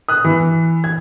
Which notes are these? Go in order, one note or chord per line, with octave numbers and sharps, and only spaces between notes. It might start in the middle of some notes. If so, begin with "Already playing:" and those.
D#6 F#6
E3
G#6